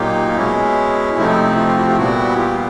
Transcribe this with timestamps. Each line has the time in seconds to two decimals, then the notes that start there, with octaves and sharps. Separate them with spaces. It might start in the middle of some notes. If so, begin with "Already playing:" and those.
Already playing: A#2 F#3 A#3 D#4 F4 G4
0.37 B2 G#3 C#4 E4
1.17 C3 F3 A3 C4 D#4 E4
1.57 D#4 F4
1.67 F4 G4
1.77 E4 F#4
1.88 F4 G4
1.97 A#2 G3 B3 E4 F#4
2.37 F4 G4